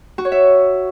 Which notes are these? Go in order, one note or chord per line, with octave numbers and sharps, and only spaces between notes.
F#4
C#5
E5